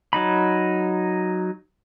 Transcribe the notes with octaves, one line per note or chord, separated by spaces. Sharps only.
F#3 D#4 B5